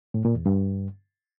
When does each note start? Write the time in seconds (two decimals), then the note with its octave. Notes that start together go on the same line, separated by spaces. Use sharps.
0.14 A2
0.25 A#2
0.35 E2
0.46 G2